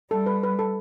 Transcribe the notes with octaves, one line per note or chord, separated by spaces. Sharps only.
G3 A4
B4
B4
A4